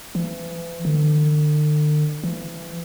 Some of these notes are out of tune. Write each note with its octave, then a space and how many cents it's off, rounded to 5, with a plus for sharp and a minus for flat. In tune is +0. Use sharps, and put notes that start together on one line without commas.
E3 +35
D3 +40
E3 +30